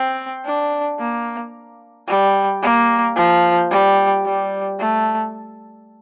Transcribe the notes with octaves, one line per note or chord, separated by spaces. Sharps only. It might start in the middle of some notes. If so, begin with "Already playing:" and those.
Already playing: C4
D4
A#3
G3
A#3
F3
G3
G3
A3